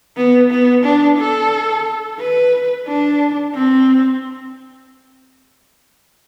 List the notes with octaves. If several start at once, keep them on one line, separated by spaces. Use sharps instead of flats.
B3
B3
D4
A4
B4
D4
C4